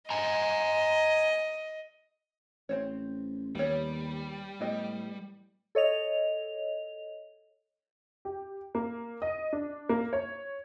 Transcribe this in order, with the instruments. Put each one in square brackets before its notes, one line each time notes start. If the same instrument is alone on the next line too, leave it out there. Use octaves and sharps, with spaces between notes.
[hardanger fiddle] D#5 [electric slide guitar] F#5 G#5 A#5
[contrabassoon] A1 [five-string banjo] C4 C5 C#5
[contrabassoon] D#2 [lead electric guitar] G3 [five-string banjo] B3 C#5
[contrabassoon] A2 [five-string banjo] B3 G4 D#5
[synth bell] A4 C#5 D#5 F7
[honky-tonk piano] G4
A#3
D#5
D4
A#3
C#5